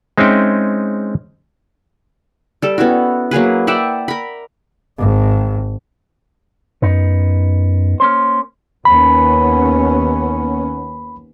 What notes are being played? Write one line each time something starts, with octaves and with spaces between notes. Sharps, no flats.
G#3 C4 C#4 D#4 E5 G5
G3 A4
B3 C#4 E4 F#4
F#3 A#3 G#4 B4
D5 E5 F#5 G5
A#4 B5
G#1
F#2 B3 D#4
A#3 C#4 C5
D#2 B3 C#4 B5